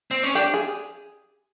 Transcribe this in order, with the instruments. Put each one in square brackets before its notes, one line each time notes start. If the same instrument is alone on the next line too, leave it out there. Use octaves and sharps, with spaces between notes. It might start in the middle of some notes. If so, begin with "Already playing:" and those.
[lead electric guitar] C4
C#4
[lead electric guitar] D4 [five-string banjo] G4
[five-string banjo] G#4